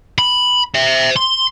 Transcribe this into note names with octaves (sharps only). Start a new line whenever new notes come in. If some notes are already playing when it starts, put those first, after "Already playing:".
B5
C5 E5
C6